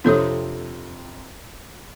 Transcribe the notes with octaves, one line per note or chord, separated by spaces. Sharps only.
F2 C3 D4 A4 C#5 D#6